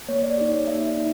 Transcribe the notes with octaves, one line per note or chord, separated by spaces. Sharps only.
A#3 C#5
D5
D#4 G4 D5
A#3 E5
D#4